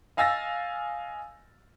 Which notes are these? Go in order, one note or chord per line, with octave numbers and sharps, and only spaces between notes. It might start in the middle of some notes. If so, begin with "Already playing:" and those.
D#5 F5 G#5 E6 A6 A#6